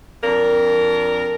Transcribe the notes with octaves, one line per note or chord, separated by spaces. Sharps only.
F2 D4 A#4